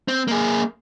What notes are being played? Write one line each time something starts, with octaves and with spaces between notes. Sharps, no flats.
C4
A#3 G#4